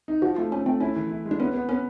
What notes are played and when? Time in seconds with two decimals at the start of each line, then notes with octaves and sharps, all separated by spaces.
0.08 D#4
0.22 F3 F#4
0.36 A3 F4
0.52 A3 C#4
0.66 A3 C4
0.80 C#4 E4
0.96 E3
1.10 E4
1.25 G#3
1.31 D4
1.40 B3 C#4
1.54 B3
1.69 B3 C#4